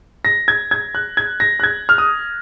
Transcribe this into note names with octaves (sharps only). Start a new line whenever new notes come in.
A#6
G#6
G#6
F#6
G#6
A#6
F#6
G#6
F6
D#6